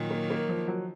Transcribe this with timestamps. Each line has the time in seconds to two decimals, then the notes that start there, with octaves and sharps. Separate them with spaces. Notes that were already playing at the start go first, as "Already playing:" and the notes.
Already playing: A#2 D#3 F#3
0.11 A#3
0.30 A#3
0.49 F3
0.68 F#3